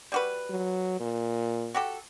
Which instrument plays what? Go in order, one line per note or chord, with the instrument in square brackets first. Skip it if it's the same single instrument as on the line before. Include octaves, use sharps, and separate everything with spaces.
[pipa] G3 F#4 B4
[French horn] F#3
A#2
[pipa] F#4 G4 A4